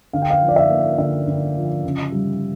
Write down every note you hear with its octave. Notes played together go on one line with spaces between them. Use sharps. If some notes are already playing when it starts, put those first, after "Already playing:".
D3 F5
G5
F5
F3
D5
E5
A#3
D3 E5
D3
F3
C#3
G3